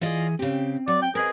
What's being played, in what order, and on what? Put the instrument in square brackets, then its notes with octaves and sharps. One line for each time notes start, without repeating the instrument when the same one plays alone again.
[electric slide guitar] E3 G#4 [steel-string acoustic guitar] F4 D5 D#5
[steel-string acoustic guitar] C#3 G4 [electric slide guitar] C4
[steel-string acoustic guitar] F#3 [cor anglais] D5
[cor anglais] G5
[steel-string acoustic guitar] C4 [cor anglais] G#4 [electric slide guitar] A#4 B4 D#5